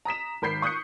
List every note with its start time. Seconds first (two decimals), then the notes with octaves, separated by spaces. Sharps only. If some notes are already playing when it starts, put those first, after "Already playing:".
0.05 A#5 D#6 B6 E7
0.42 G#1 A#4 B5 G6 B6 C7
0.62 C#6 D#6 F#6 G6 C7 C#7